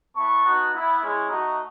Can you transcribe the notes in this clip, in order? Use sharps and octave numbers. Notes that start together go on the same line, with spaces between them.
B3 E4 A5 C#6
B3 D#4 F#4
B3 E4
G#3 C#4 E4
A3 D#4 F#4